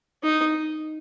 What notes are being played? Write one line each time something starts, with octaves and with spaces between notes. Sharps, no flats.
D#4